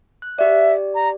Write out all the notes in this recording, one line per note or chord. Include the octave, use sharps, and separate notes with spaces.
F#6
G4 D5 E5
A#5